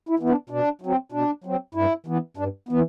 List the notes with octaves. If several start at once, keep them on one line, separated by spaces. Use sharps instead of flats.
E4
E3 B3
D4
B2 D4
F#3 C4
B2 D4
F#3 C4
G2 E4
E3 B3
G2 D4
E3 B3